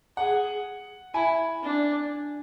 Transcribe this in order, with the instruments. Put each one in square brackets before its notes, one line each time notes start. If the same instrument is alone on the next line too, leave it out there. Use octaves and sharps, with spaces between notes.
[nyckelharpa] G#4 [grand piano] F#5
[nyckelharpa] E4 [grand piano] G#5
[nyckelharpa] D4